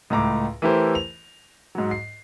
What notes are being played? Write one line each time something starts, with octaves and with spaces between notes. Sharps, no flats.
C#2 A2 A#5 D6
E3 A3 E4 G4 A#4 C5
F7
G#2 F#3
C7